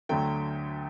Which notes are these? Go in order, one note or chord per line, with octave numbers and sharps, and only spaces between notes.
D2 D3 F#3 A3 G5